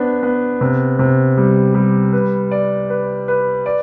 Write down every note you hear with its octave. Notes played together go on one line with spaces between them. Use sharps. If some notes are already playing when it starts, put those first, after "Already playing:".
Already playing: B3 D4 C5
B3
C3
C3
G3
G3
B4
D5
B4
B4
D5